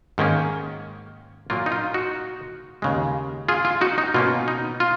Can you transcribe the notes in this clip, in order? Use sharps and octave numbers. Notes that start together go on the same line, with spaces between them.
G#2 D#3 A#3 C#4
A#2 F#3 A#3 F4
D#4
F4
D#4 F#4
D#2 C#3 G#3
F4 G#4
F4
D#4 F#4
D#4
B2 A#3 C#4 F4
D#4
F4